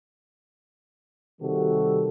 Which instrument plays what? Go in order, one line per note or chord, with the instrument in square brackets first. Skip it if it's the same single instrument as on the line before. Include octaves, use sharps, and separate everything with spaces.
[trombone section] C3 D#3 G3 F#4 A4